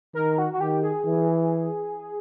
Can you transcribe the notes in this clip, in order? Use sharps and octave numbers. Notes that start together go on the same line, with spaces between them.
D#3 A#4
F#4
F#4
D#3 G4
G#4
E3